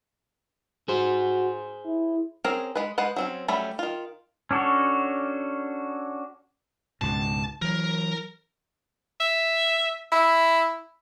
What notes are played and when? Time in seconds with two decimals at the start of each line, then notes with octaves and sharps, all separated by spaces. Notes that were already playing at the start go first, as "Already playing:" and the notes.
0.88 F#4 G#4 C5
1.85 E4
2.44 C4 C#4 G#4 A#4
2.75 G#3 B4
2.98 G#3 B4 C5 F#5
3.16 F#3 C4 C#4
3.48 F#3 G3 A3 C#4 B5
3.79 D#3 F4
4.51 C#4 D4 F#4 A4 C#5
7.01 C#2 G#2 B2 A5
7.62 E3 F#3 A#4
9.20 E5
10.12 E4